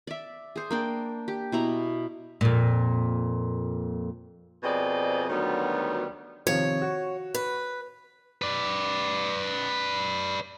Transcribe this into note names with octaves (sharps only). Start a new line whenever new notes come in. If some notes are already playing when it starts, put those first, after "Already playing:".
D5 E5
G#4 C5
A#3 D4 G5
G4
B2 E4 A#5
F2 A#2
F2 B2 C4 G#4 D5 D#5
D2 D#3 F#3 G3 B3
C3 D#3 F3 C#5
F#4
B4
B4 D5